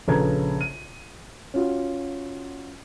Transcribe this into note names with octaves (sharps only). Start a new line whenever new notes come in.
A#1 C#3 A4 B4 A#5 G#6
D#7
C#4 F4 F#4